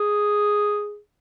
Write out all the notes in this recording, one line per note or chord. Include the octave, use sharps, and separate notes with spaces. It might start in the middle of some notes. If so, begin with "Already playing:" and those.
Already playing: G#4